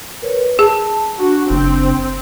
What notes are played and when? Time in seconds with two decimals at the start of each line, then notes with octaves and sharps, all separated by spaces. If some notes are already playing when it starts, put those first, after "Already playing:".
0.22 A#4 B4 C#5
0.59 G#4 A5
1.20 D4 F#4
1.50 F#1 C4